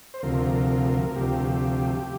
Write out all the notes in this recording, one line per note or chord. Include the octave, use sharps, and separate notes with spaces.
C5
D2 C3 F3 A#4
D2 C3 F3 G4